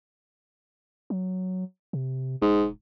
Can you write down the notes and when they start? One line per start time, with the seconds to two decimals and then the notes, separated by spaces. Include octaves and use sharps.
1.10 F#3
1.93 C3
2.42 E1 G#2